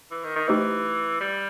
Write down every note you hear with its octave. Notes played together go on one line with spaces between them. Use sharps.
E3
D#3
D#3
E3 A3 D#4 G4 C5 D#5
G3